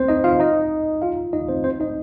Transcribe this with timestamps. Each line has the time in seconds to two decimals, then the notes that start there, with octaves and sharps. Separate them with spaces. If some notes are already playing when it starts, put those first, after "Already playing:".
Already playing: C4 C5
0.08 D#4 D#5
0.24 F4 F5
0.40 D#4 D#5
1.02 F4 F5
1.33 D#4 D#5
1.49 C4 C5
1.64 C4 C5
1.80 D#4 D#5